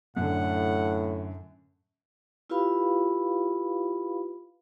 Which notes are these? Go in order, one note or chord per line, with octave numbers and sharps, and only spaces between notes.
F#2 A2 D3 F#5
E4 F4 G4 B4 F5 B5